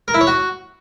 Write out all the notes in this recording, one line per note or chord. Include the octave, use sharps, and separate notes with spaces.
A#4
E4
C#5
F#4